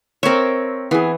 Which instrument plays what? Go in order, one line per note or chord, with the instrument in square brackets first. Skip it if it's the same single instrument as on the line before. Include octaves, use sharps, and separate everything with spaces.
[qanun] C4 E5 [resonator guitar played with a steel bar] A#4 C#5
[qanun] E3 [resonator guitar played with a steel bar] B3 G#4